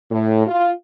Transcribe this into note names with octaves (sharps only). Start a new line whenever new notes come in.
A2
F4